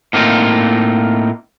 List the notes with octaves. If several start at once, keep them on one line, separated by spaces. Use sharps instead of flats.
A2 A#3 C4 D#4 F4